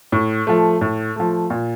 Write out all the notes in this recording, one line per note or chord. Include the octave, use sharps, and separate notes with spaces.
A2
F3 A3
A2
F3 A3
A#2